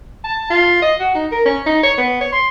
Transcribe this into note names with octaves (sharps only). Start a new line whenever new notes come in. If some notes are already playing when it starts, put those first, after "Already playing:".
A5
F4
D#5
F#4
D#4
A#4
C#4
D#4
C#5
B3
C#5
C6